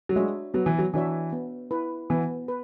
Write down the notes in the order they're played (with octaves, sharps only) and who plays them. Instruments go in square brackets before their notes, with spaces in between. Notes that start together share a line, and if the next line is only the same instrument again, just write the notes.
[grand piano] F#3
[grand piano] G#3 [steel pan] D4 F#4 C#5 E5
[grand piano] F#3 [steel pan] B3
[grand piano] E3
F#3
[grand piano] E3 [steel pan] D4 F#4 C#5 E5
[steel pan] B3
E4 B4
[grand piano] E3 [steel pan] B3
[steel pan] B4